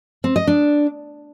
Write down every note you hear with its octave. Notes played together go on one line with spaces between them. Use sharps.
C4
D#5
D4